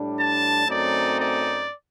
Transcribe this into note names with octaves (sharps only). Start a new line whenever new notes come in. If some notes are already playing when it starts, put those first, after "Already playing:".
Already playing: A2 G3 D4
A5
F#2 F#3 A3 C4 D#4 D5
D5